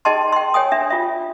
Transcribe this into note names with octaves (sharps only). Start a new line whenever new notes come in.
D#4 G#4 D#5 G5 A5 C6
G5 C6
C#5 G5 G#5 D#6
D4 E5
F4 E5